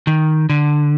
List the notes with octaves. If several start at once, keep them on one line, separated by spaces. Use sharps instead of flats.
D#3
D3